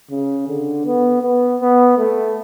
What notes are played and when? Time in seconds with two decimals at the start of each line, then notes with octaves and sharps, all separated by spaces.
0.11 C#3
0.48 D3
0.86 B3
1.22 B3
1.61 B3
1.98 A3